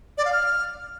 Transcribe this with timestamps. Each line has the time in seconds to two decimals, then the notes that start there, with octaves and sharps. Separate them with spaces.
0.18 D5
0.25 F5
0.33 F6